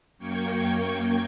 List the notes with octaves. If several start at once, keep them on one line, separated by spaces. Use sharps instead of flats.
F#2 A#3 G5 C#6 G#6 C#7